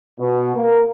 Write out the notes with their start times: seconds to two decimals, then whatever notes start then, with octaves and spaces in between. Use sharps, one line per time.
0.20 B2
0.56 A#3